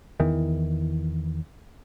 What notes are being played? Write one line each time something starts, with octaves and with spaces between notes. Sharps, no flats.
E2 D#3 E3